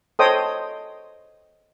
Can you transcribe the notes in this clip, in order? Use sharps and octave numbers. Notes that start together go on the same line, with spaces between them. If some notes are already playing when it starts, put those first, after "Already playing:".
A4 C5 C#5 D#5 G5 D#6